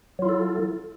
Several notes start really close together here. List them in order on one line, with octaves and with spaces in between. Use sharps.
F#3 F4 E4 A4